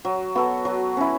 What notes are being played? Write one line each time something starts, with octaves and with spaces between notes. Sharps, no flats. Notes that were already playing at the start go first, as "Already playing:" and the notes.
F#3
B3 F#4 A4
F#3
C#4 E4